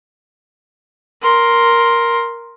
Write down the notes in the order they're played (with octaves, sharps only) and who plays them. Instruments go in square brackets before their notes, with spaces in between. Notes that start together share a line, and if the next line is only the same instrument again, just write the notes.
[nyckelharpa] A#4 C6